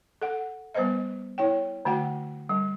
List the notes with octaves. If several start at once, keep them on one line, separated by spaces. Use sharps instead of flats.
A4 F#5
G3 B3 B4 C5 D#5 E5
E4 C#5 G5
D3 A3 F#4 F#5 G5
G3